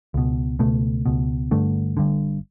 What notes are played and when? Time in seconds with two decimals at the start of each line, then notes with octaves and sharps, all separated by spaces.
0.14 C#2 B2
0.59 C#2 B2 A3
1.06 C#2 B2
1.51 G1 G2 D3 A3
1.97 G1 G2 D3